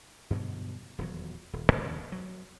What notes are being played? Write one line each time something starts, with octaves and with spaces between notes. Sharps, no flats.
G2 B2 D3 F#3
D#1 E2 F#3
D#1
D#2
F#3